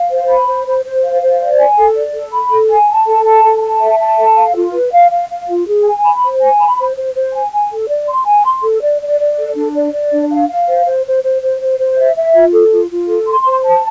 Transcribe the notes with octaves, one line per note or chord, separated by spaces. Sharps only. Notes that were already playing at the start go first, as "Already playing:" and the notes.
Already playing: F5
C5
B5
C5
C5
C5
F5
C5
D5
G#5
A4
D5
A4
B5
A4
G#5
A5
A4
A5
A4
A5
E5
A5
A4
F5
F4
B4
F5
F5
F5
F4
G#4
G#5
B5
C5
G#5
B5
C5
C5
C5
G#5
G#5
A4
D5
C6
G#5
C6
A4
D5
D5
D5
A4
D4
D5
D5
D4
F5
F5
C5
C5
C5
C5
C5
C5
C5
E5
E5
F4
A4
F4
F4
A4
C6
C5
A5